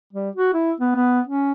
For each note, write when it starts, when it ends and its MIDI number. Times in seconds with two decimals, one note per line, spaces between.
0.13 0.29 55
0.35 0.50 66
0.54 0.72 64
0.80 0.92 59
0.95 1.20 59
1.27 1.52 61